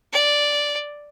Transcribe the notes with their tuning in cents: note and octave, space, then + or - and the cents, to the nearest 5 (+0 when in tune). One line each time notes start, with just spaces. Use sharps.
D5 -5